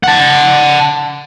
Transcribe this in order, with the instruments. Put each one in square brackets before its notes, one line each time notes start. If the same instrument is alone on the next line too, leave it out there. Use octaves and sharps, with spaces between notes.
[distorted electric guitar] F#5 A5